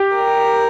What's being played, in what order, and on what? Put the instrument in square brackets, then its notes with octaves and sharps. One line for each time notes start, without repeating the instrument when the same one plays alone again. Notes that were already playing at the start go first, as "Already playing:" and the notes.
Already playing: [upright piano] G4
[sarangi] A#4